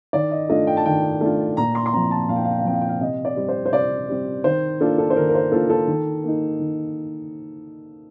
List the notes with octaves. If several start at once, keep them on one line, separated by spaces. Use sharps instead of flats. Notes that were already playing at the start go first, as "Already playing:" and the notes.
D#3 D5
D#5
A3 D4 F4 D#5
G5
A5
D#3 G5
A3 D4 F4
A#2 A#5
C6
C6
F3 C4 A#5
A5
A#2 F5
G5
F5
G5
F5
F3 C4 G5
F5
G5
F5
C3 D#5
D5
G3 C4
C5
C5
C3 D5
G3 C4
D#3 C5
A#3 D4 F4 A4
A4
C5
D#3 A#4
A#4
C5
A#3 D4 F4 A4
A4
D#3
A#3 D#4
D#3